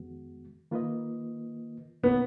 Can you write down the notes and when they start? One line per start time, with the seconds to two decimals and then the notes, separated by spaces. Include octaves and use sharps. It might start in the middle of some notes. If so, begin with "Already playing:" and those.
Already playing: F2 D#3 G#3 B3 F#4
0.71 D#3 A#3 F4 B4 D#5
2.03 B2 A#3 B3 D#4 A#4 C#5